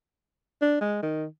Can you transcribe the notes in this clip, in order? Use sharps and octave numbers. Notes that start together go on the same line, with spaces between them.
D4
G#3
D#3